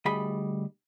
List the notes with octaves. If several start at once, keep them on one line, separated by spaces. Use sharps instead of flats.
D2 G3 G#4 D#5 B5